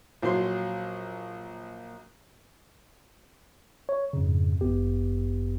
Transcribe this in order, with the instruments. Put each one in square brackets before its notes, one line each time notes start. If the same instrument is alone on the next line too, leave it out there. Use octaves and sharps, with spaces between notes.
[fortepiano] A#1 F#3 C6
[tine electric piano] C#5
F2 G#2 C#3
G1 F#2 B3 G4